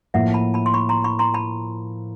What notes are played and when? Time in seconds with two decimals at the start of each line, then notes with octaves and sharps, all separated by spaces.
0.14 A2 F3 A#3 E5 F#5
0.34 A5 B5
0.54 A5 B5
0.66 C6
0.74 B5 C#6
0.89 A#5 C6
1.04 B5 C#6
1.19 A#5 C6
1.34 A5 B5